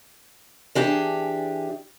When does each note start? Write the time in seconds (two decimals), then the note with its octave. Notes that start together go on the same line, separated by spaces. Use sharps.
0.75 E3 D4 G4 G#4